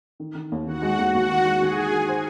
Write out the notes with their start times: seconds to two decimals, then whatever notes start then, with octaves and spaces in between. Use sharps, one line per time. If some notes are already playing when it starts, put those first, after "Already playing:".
0.20 D#3
0.35 D#3
0.52 D#2
0.67 D#3 F#4 F#5
0.82 G#3
0.99 D#2
1.14 D#2 F#4 F#5
1.30 D#3
1.45 G#3
1.61 D#3 G#4 G#5
1.78 D#3
1.93 D#3
2.09 C5